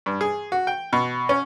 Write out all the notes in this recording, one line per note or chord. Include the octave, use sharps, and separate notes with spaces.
G2
G#4
F#4
G5
B2
C#4